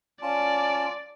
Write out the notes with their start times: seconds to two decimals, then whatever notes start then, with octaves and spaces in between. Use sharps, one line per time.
0.22 C#4 F4 D5 A5